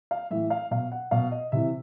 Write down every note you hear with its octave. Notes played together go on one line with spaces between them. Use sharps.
F5
A2 E3 E5
F5
B2 F5
F#5
B2 F5
D#5
C3 E3 E5